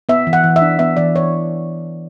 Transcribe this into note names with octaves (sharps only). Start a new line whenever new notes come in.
B3 E5
E3
F#5
E3
E5
D4
B3 E5
E3 D5
E3 C#5